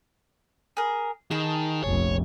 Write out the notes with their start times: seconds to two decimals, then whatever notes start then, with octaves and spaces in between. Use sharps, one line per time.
0.77 G#4 A#4
1.31 D#3 G#4 A5
1.83 F1 A#1 C#5